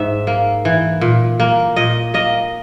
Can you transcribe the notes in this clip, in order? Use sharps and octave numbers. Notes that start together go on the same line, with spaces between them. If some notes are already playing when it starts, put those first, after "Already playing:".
Already playing: G#2 E5
A#3
E3
A#2
A#3
A#2 D#5
A#3 D#5